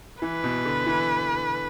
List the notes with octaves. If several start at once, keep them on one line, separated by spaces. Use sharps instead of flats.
E3 B4
B2
D3
E3